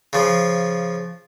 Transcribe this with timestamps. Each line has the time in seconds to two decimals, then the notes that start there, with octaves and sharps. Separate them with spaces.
0.13 C#3 F3